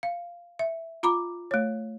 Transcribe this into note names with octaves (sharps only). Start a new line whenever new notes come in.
F5
E5
F4 A#5 B5 D6
A3 C#5